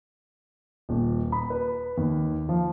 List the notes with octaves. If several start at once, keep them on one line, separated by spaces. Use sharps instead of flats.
D#1
B5
B4
D#2
F3